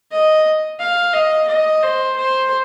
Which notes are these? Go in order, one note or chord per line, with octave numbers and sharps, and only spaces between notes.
D#5
F5
D#5
D#5
C5
C5